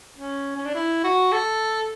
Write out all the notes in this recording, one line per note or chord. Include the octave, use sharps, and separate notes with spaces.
C#4
C#4
D4
E4
F#4
A4